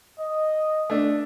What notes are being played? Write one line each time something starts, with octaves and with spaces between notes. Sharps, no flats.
D#5
A3 D4